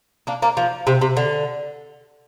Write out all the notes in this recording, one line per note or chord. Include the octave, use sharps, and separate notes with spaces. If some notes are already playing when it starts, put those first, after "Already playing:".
A#3 D4
A#3 D4
F3
C3
C3
D3